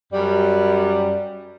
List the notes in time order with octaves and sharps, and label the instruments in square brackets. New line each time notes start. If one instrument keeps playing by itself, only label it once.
[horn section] F#2 G3